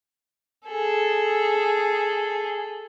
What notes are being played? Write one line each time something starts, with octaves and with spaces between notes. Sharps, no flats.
G#4 A4